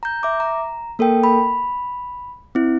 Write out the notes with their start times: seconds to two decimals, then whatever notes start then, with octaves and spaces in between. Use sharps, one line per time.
0.03 A#5 G6
0.23 E5 D6
0.40 A#5
0.99 A#3 A4 A#4 G5
1.24 B5
2.55 C4 E4